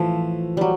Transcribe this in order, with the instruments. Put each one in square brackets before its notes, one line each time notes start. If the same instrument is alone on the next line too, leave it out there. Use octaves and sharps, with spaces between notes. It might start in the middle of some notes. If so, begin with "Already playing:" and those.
Already playing: [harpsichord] A2 E3 [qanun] F3
[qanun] F#3 G3